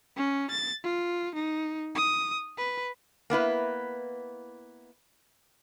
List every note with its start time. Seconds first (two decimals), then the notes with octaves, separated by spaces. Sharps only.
0.16 C#4
0.51 A6
0.84 F4
1.35 D#4
1.95 D#6
2.58 B4
3.30 A#3 B3 E4 B4